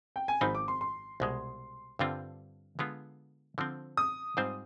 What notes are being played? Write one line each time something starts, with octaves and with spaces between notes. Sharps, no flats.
G5
G#5
G#1 G#2 F3 C4 D#4 B5
D6
C6
C6
C2 B2 G#3
G2 D3 G3 C4 F4
D3 G#3 B3 F4
D3 F3 C4
D#6
G#2 G3 C4 F4 C5